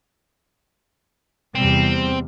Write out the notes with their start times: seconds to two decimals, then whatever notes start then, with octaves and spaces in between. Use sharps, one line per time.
1.55 E2 C3 G3 C4